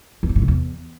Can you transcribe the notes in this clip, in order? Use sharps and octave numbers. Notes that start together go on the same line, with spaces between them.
E2
G2
A2
C3
E2